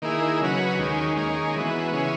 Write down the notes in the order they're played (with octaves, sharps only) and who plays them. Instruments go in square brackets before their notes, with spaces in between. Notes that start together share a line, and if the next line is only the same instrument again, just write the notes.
[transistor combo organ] D#3 A#3 E4 G#4
C#3 F#3 C#4 F#4 B4
D#2 D#3 G#3 C#4
D#3 A#3 C#4 G#4
E3 G#3 B3 F#4
C#3 E3 G#3 C#4